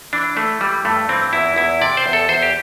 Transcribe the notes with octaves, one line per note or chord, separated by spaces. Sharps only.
E3 D4
E3 A3
E3 G3
G2 A3
E3 C4
E2 E4
E2 E4
C3 D5
C5
E2
A4
E2 C5
G4